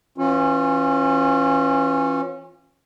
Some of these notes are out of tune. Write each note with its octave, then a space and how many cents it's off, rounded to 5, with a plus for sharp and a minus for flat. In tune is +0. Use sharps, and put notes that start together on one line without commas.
E3 +0 C#4 -25 F4 +25